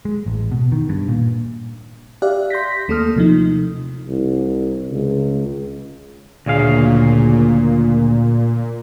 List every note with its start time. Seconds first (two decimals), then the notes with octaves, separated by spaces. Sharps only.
0.05 G#3
0.26 A1
0.51 B2
0.72 D#3
0.89 G2
1.08 A#2
2.22 G4 D5 E5 F5 F#6
2.50 C6 G6 A#6 B6
2.88 D#2 A3 A#3 A4 D#6 F6
3.16 C3 F3 D#4
4.08 C2
4.91 C#2
6.46 D2 A#2 C#3 F5